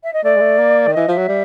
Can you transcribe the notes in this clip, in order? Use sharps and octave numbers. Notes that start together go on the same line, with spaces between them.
E5
D#5
A3 D5
G#3
A3
A#3
D#3
E3 D#5
F3 E5
F#3
G3